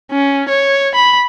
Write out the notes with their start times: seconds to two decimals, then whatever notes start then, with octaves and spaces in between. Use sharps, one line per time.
0.12 C#4
0.49 C#5
0.95 B5